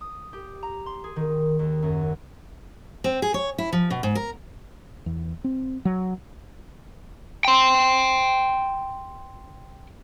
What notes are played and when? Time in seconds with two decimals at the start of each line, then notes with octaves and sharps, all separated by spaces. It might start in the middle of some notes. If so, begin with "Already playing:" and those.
0.01 D#6
0.33 G4
0.63 A#5
0.86 C6
1.04 G#4
1.16 D#3
1.59 D#2
1.82 F#2
3.04 C4
3.22 G#4
3.34 C#5
3.58 E4
3.73 F3
3.90 B2
4.03 G#2
4.15 A#4
5.06 E2
5.44 C4
5.85 F#3
7.45 G5 C6